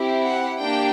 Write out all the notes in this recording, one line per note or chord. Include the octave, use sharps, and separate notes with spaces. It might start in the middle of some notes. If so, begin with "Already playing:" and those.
Already playing: C4 E4 G4
F#5
A#3 D4 G4 G5